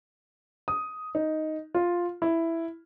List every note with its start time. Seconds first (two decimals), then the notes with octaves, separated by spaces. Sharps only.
0.68 D#6
1.15 D#4
1.75 F4
2.22 E4